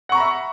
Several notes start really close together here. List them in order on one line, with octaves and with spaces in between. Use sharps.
F#5 C#6 A#5 B5 E5